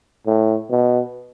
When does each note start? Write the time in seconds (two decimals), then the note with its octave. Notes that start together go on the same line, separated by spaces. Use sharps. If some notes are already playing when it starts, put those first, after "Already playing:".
0.27 A2
0.71 B2